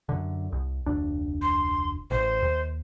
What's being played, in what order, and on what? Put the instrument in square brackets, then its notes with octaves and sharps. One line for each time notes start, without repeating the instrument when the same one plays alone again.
[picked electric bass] F#2 D3
C2
F1 D2 D4
[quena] C6
[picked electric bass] A1 [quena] C5
[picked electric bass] D#2